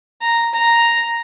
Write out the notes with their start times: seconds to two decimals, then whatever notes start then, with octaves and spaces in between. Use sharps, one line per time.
0.22 A#5
0.53 A#5